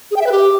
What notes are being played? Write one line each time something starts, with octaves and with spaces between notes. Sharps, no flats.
G#4
G5
E5
B4
G4